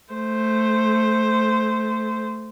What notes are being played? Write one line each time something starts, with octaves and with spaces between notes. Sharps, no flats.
A3 C5